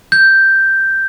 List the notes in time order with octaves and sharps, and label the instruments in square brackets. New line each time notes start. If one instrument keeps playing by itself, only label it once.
[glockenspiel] G6